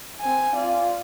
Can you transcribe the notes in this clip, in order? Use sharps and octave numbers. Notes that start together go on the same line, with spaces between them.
C4 G#5
F4 D5